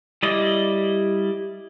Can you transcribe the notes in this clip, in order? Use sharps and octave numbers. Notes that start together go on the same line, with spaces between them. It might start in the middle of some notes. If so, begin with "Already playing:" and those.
G3 E4 D5 D#5